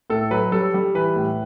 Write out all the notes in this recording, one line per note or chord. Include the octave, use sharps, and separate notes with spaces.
A2 A4
F#3 B4
G3 A4
G3
E3 B4
A2